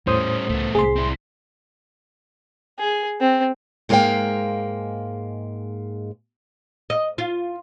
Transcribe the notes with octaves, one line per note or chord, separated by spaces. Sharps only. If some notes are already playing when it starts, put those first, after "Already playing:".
E2 A2 G3 C#4 C5 D#6
C#2 A3 B3
C2 G#4 C6
C4 E4
G#4
C4
G#2 G#3 A#3 F4 F5 G5
D#5
F4